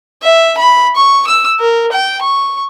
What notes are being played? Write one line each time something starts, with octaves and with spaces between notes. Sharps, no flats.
E5
B5
C#6
E6
A#4
G5
C#6